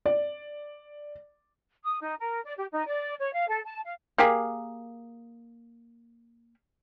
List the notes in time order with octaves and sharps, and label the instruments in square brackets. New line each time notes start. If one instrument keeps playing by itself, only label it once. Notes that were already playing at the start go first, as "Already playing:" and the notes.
[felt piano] D5
[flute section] D#6
D#4
A#4
D5
G4
D#4
D5
C#5
F5
A4
A5
F5
[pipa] A#3 G4 G#4